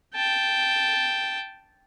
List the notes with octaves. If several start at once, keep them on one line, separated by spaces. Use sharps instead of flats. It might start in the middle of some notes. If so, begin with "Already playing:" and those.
G5 A5